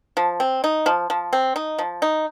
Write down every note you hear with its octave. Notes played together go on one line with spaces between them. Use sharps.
F3
C4
D#4
F3
F3
C4
D#4
F3
D#4